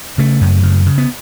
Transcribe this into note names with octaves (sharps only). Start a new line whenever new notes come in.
C#3 A3
F#2
C#3
C#3
B3